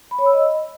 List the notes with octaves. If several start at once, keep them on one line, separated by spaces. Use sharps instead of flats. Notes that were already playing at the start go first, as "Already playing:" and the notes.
B5
C#5
E6
D#5